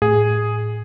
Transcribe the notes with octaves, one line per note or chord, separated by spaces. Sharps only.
A2 G#4